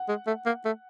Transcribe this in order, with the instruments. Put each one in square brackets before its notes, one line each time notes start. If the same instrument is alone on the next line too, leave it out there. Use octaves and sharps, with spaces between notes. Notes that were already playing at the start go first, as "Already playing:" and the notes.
Already playing: [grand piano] F#5
[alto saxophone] G#3
A3
A#3
A3